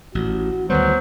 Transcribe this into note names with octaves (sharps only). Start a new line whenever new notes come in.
A1 F#4
D2 D#3 F#3 G3 B3 C5